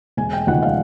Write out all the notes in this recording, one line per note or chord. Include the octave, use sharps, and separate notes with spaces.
E1 G#5
G5
D#2 C#3 F3 G#3 F#5
F5